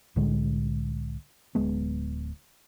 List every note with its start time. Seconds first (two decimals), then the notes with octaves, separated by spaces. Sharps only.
0.16 C2 A2 D3 G#3
1.55 D1 G#3 B3